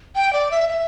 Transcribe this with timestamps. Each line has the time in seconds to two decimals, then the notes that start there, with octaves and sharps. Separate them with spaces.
0.15 G5
0.33 D5
0.51 E5
0.69 E5